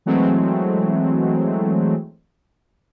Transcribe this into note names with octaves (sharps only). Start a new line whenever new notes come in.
E3 F#3 G#3 A3 C4